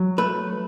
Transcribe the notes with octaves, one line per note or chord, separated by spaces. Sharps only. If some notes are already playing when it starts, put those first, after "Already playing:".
Already playing: F#3
A3 B4